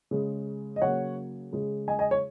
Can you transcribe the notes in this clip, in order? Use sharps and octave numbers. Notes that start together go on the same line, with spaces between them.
C#3 G#3
D#5
C#3 F#3 A#3 C#5 F#5
C#3 G#3
D#5 G#5
D#5 G#5
C#5